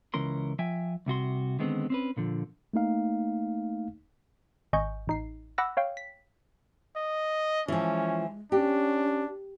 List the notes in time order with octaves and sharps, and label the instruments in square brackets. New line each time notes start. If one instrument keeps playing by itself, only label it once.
[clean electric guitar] C#2 E3 C#4 A#4 C6
F3 E5 G5 G#5
C2 C3 F#4 C6
D3 D#3 G#3 B3 C4
C4 C#4 B4
A#2 D3 F3
[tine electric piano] A3 A#3 D#4 F5
[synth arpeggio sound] G#1 D#5 G#5 C#6 G6
A1 D#4 C7
F#5 B5 D6 E6 F#6 A#6
C#5 F5 G5
B6
[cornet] D#5
[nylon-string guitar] E3 F3 [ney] G#3 [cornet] C#4
[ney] C#4 [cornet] D4 [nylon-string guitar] G4